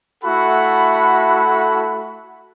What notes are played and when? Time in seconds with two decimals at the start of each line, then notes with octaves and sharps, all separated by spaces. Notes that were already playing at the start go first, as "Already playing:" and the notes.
0.23 A3 E4 F#4 A4 F#5 B5